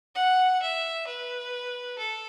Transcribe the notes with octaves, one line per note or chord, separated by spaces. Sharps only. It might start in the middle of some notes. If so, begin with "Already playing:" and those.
F#5
E5
B4
A4